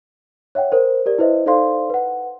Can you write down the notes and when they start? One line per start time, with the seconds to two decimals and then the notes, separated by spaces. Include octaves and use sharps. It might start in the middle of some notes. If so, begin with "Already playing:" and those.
0.55 C#5 E5 F#5 G5
0.72 A#4 C5
1.06 G4 A#4 D5
1.18 E4 B4 C5 D#5 E5
1.46 D#4 A4 C5 D5 F5 C6
1.90 B4 F#5